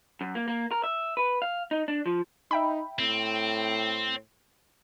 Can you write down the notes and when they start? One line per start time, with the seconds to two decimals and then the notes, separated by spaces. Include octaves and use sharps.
0.21 F#2
0.35 A#3
0.48 A#3
0.71 A#4
0.84 E5
1.17 B4
1.42 F5
1.71 D#4
1.88 D4
2.06 F3
2.51 D#4 E5 G5 B5
2.99 A2 C4